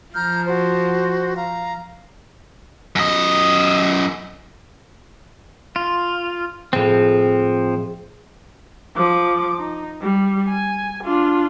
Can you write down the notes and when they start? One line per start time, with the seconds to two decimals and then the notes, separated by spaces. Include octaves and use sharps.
0.15 F3 A#5 F6 G6
0.46 F#4 C5
1.36 F5 A#5
2.96 F#2 D#5
5.76 F4
6.73 A2 F3 G#3 C4
8.96 F3 D6
9.58 D#4
10.01 G3
10.49 G#5
11.04 D4 F4